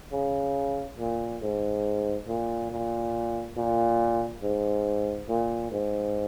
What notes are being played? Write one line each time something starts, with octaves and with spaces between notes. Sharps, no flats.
C#3
A#2
G#2
A#2
A#2
A#2
G#2
A#2
G#2